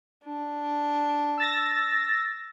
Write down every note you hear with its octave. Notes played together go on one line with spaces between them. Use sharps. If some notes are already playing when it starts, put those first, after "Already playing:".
D4
E6 A6 A#6